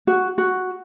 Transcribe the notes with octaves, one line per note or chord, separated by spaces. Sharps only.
F#4
F#4